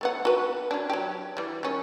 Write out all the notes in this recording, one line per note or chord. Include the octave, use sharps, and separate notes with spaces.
A3 B3 F#5
F#4 B4
C#4 D4
F#3 G4
E3 G3
D#3 C#4